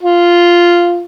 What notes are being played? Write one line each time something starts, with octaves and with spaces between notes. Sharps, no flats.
F4